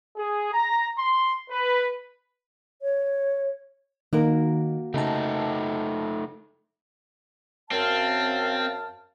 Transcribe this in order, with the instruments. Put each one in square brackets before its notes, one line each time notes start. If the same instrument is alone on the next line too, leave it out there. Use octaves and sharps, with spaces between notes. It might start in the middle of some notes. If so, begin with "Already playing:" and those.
[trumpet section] G#4
A#5
C6
B4
[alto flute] C#5
[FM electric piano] D#3 D#4 [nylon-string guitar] A#3 F#4 A#4
[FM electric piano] C#3 A5 [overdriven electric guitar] A3 D#4
[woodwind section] F#2 F5 A5 [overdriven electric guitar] C4